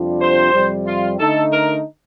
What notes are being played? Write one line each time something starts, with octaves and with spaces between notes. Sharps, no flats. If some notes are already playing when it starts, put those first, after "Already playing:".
Already playing: F2 C3 G3 D4 F4
C5
F2 C3 G3
F4
D3 A3 D#4 A4
A#4